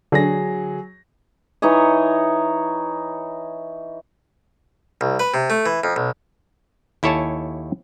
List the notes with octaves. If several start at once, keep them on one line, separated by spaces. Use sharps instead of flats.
D3 F#3 G#4 A#6
E3 D#4 C#5 D#5
C2
B4
C3
A3
E3
F2
B1
D#2 E4 A4 C#5 G#5 A5